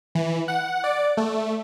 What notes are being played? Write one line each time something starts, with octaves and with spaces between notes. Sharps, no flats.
E3
F#5
D5
A3